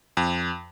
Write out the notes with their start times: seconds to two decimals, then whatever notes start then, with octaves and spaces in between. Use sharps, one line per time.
0.17 F2